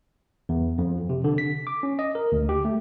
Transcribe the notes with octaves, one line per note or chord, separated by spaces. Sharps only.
E2
F2
C3
D3
B6
D6
C#4
D#5
A#4
D2
G4
A3